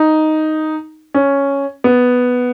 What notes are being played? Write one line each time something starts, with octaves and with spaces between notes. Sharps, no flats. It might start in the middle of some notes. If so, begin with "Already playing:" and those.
Already playing: D#4
C#4
B3